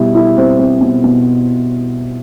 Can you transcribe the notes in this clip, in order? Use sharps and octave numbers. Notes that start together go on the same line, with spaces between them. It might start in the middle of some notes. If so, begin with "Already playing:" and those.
Already playing: B2 G3 E4
E4
C4
C4
B2
B2